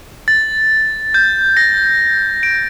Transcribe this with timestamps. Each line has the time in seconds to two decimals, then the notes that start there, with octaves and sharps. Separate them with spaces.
0.28 A6
1.14 G6
1.57 A#6
2.43 D7